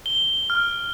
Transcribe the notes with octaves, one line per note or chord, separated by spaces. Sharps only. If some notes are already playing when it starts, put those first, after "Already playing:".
G7
F6